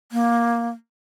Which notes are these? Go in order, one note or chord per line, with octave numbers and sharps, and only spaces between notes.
A#3